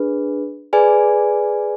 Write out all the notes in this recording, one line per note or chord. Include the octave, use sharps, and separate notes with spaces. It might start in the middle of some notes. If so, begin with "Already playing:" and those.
Already playing: D4 G#4 B4
G#4 B4 D5 G#5